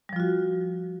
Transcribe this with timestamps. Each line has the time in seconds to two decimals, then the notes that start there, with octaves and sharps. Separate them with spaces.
0.09 G3
0.13 F3
0.16 F4
0.20 F#4